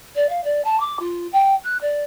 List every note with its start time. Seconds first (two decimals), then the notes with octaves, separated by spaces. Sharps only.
0.15 D5
0.29 F5
0.44 D5
0.64 A5
0.80 D6
0.99 F4
1.32 G5
1.63 F#6
1.81 D5